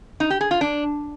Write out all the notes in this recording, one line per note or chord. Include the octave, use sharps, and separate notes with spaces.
D#4
G4
G#4
F4
D4